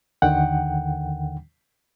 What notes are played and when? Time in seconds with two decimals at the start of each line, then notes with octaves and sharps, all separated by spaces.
0.22 D#2 D3 D#3 F#5 G5